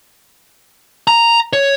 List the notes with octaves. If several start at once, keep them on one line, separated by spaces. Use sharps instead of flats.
A#5
C#5